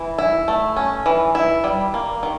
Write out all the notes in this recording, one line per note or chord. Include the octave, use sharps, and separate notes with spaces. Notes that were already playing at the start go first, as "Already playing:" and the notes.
Already playing: E3
E4
A3
C#4
E3
E4
G3
A#3
D#3